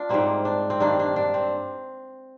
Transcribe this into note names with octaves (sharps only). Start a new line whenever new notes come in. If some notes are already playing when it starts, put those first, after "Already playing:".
Already playing: D4 F4
G#2 G3 A#3 C4
D4
C4
G2 D#3 A#3 D4
D4
D4
C4